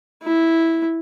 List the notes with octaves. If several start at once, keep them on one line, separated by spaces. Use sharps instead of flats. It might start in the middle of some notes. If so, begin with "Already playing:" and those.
E4